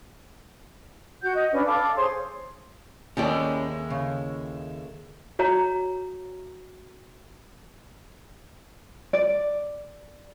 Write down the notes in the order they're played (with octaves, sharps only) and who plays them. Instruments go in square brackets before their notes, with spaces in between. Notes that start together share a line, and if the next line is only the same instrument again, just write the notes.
[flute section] F#4 F#5 G6
D#5
C#4 D4 B4
A4 F5 D6
G#4 C5 C#5 C6
[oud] D#2 [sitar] A2 G#3 [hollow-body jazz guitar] C#4 G4 D5
[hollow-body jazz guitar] C#3
[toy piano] F#4 C#5 A#5
[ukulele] D5